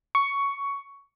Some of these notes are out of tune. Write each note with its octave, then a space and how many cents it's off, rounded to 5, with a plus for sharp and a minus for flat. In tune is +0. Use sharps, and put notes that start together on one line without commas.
C#6 +10